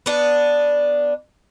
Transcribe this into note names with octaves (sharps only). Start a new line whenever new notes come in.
B3 D4